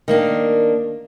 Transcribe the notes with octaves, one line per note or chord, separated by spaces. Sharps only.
D#3 A#3 D4